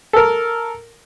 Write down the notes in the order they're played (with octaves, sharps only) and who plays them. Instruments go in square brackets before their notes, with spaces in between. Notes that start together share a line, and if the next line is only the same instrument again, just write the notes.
[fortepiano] A4 A#4